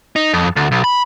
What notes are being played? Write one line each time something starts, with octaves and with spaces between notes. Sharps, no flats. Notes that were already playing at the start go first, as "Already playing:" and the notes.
D#4
F2
D2
B1
B5